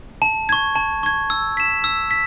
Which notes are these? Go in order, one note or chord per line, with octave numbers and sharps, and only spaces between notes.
A5
C#6 G#6
A5
C#6 G#6
E6
B6 E7
E6
B6